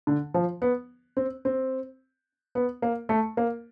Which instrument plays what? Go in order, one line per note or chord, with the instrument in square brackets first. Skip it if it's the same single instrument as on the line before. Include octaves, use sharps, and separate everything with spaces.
[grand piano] D3
F3
B3
C4
C4
B3
A#3
A3
A#3